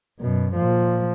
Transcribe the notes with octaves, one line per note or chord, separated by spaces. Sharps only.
F#2 B2
A#2 F3